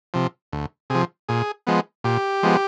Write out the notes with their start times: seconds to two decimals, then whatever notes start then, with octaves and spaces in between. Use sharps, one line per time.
0.14 C3 F3
0.53 D2
0.90 C3 F3 G#4
1.29 A#2 G#4
1.67 F3 G#3 B3
2.04 A#2 G4
2.43 F3 G#3 B3